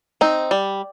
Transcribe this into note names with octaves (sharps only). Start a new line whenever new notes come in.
C4 D#4
G3